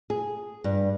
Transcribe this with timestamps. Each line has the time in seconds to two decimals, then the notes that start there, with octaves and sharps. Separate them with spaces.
0.10 G#4
0.64 G2